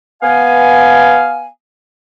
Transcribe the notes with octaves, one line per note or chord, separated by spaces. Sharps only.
B3 F5 G#5